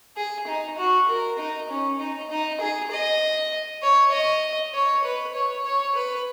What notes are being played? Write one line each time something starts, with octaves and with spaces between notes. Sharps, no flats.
G#4
D#4
F#4
A#4
D#4
C#4
D#4
D#4
G#4
D#5
C#5
D#5
C#5
B4
C#5
C#5
B4